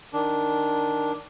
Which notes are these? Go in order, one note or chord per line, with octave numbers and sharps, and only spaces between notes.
D#3 D4